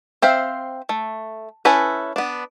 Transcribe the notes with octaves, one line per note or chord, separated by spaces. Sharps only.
C4 C5 E5 F5
A3
C#4 E4 A4 B4
B3 D4